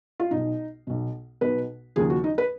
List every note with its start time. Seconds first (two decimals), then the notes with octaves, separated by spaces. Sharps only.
0.20 F4
0.31 B1 B2 D#4
0.87 B1 B2
1.41 B1 B2 B4
1.96 D#2 C#3 F3 G#4
2.10 F#4
2.24 D#4
2.38 B4